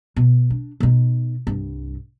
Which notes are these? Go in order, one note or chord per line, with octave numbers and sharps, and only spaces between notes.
B2
D4
B2 D#4
C2 G2